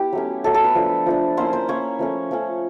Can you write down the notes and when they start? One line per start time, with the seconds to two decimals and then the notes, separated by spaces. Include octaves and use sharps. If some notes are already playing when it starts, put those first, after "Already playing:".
Already playing: B3 E4 G4
0.13 F#3 A3 C#4
0.44 F#3 A3 C#4 A4
0.54 A4
0.65 B4
0.75 F3 A3 D4
1.06 F3 A3 D4
1.37 A#3 C#4 E4 C5
1.53 C5
1.68 A#3 C#4 E4 C#5
1.99 F3 A3 C#4
2.31 F3 A3 C#4